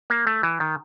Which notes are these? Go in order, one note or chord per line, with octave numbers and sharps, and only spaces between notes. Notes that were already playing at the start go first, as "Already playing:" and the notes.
A#3
A3
E3
D#3